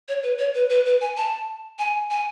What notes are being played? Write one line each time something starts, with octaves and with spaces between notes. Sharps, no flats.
C#5
B4
C#5
B4
B4
B4
G#5
A5
G#5
G#5